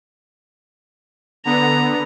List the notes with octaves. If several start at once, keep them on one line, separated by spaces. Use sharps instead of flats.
D3 B3 A#5